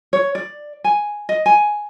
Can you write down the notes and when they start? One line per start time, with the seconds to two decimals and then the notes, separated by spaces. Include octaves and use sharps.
0.13 C#5
0.35 D5
0.84 G#5
1.29 D#5
1.46 G#5